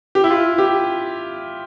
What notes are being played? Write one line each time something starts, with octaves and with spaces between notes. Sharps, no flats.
G4
E4
F4
G4